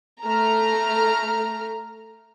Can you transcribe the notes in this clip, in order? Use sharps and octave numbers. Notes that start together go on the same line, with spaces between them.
A3 A#5 F6